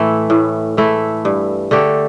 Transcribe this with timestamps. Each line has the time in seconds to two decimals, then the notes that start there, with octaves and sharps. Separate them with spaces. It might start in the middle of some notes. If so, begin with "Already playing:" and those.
Already playing: A2 E3 A3 E4
0.30 A2
0.77 E3 A3 E4
1.25 G2
1.71 D3 A3 G4